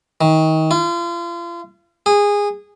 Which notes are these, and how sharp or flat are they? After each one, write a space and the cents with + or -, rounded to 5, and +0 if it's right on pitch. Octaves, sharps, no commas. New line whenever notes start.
D#3 +30
F4 -35
G#4 -20